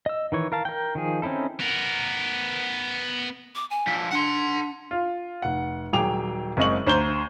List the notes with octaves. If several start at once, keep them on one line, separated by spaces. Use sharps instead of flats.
D#5 E6
D#3 E3 C#5
A#4 F5 A5
A#4 G5
D#3 F3 G#4
C4 C#4 D#4 E4 A4
B3 A#4
D6
G#5
D3 F3
D4 F#5 C6
F4
F1 F#5
D#1 F#3 G#4 G5 D6 F7
F#1 G#3 C4 D#5 C#6 F#7
D2 C5 A#5 G6 G7